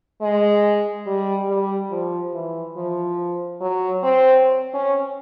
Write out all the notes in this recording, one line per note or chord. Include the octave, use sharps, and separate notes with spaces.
G#3
G3
G3
F3
E3
F3
F#3
C4
C#4